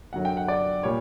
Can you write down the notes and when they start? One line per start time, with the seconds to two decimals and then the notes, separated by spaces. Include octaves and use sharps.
0.13 F#2 D3 F#3 F#5
0.25 G5
0.37 F#5
0.48 D5
0.83 A#2 G3 C#5